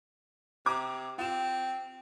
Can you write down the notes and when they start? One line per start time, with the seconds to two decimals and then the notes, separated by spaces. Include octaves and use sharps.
0.66 C3 A#5 D6 G#6
1.18 C4 F4 E7